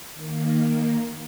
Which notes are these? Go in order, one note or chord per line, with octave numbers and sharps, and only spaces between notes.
D#3 A#3